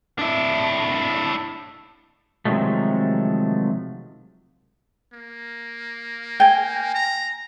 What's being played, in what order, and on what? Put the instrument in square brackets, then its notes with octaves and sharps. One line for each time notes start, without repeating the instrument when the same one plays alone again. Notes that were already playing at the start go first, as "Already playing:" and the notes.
[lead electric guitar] D4 E4
[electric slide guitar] C3 D#3 F3 F#3 G#3 A3
[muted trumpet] A#3
[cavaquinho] G5 G#5
[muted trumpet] A#5